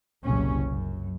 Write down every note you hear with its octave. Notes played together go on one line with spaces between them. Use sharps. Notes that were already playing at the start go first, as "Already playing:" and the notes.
F#1 C2 A#2 C#4
F#2